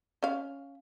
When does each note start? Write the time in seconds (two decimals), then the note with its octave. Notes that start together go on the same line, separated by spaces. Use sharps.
0.23 C#4 F5